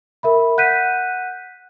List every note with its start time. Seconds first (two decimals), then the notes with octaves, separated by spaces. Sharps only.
0.23 A#4 E5 B5
0.58 F#5 F#6 G6 B6 D#7